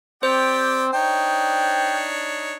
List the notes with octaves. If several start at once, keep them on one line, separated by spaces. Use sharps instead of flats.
C4 G4 C5 D5 G5
D4 D#4 C#5 G5